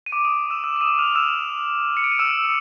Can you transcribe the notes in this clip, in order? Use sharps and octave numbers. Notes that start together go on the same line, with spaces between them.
D#7
D6 D7
D#6 D#7
E6 E7
E6 E7
E7
D#6 D#7
F6 F7
E6 E7
C#7
D7
D#7
E6 E7